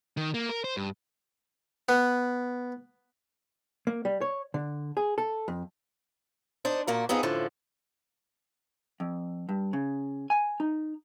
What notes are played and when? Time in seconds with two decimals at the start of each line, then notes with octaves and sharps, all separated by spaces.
0.17 D#3
0.34 A#3
0.49 A#4
0.64 C5
0.77 G2
1.89 B3
3.87 A#3
4.05 G3
4.21 C#5
4.54 D3
4.97 G#4
5.18 A4
5.48 F2
6.65 D4 D#4 C5
6.87 A#2 A#3 F#4
7.09 B3 C4 D#4 F4 G#4
7.23 F#2 A2 D3 F3
9.00 F2
9.49 G2
9.73 C#3
10.30 G#5
10.60 D#4